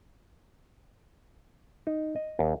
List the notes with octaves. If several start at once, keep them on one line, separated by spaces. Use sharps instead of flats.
D#4
D#5
D#2